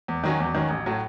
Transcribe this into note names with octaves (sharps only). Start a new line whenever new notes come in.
E2
D#3 F#3 C#4
E2
D#3 F#3 C#4
A1
A2 F#3